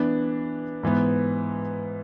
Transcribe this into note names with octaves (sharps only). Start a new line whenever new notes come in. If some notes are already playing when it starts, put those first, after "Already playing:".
Already playing: E3 B3 D4
G#2 E3 B3